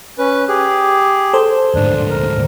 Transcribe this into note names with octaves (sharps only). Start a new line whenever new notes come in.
C#4 B4
G4 G#4
A4 C5
D2 G#2 D4
A#4